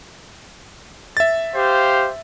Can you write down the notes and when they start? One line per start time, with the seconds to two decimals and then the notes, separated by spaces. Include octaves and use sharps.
1.17 E5 A6
1.54 G4 C5 F5